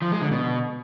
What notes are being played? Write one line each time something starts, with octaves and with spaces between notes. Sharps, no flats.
F3
G#3
D3
B2